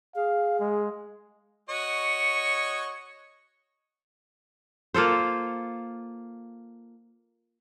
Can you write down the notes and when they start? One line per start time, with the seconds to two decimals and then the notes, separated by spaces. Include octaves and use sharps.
0.16 G#4 F5
0.60 G#3
1.69 F#4 C#5 D#5
4.94 A#3 F4 A4 C5